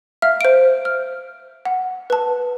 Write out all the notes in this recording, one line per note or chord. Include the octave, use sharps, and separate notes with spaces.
E5 F5 F6
C5 D7
F6
F#5
B4 A5